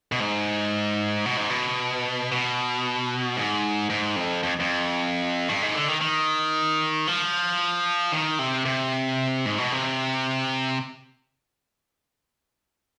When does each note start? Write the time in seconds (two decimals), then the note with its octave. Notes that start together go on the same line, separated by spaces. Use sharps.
0.12 B2
0.20 G#2
1.26 B2
1.37 G#2
1.50 B2
2.32 B2
3.37 G#2
3.90 G#2
4.16 F2
4.43 F2
4.60 F2
5.49 G2
5.62 G#2
5.74 D3
5.88 D#3
6.01 D#3
7.07 F3
8.12 D#3
8.39 C3
8.66 C3
9.46 G#2
9.59 B2
9.72 C3